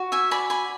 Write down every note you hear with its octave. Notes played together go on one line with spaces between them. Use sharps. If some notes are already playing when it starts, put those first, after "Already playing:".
Already playing: F#4
E5 G#5
D5 G#5 B5
G#5 B5